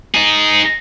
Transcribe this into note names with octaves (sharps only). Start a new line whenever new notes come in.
D#4 G#4